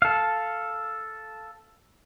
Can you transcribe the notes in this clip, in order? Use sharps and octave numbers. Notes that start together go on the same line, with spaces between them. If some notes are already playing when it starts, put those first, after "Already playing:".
A4 F5